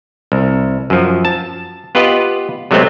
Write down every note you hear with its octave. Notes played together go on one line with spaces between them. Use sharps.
C2
F#2 F3
A5
B3 F4 G4 B4 D#5
C3 F#3 G#3 A3 B3 C4